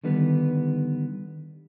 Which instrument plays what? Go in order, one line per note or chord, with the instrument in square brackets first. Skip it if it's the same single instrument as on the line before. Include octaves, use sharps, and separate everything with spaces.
[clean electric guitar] D3 D#3 G3 B3 B4